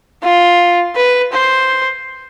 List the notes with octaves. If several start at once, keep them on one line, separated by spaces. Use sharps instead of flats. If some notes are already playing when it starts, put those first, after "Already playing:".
F4
B4
C5